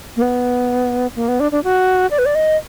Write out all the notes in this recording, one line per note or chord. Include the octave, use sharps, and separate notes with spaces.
A#3
B3
A#3
B3
D4
D4
F#4
D5
B4
D5
D#5